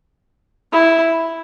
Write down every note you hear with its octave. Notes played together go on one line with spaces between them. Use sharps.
E4